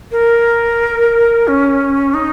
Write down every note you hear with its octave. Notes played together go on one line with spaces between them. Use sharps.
A#4
C#4
D#4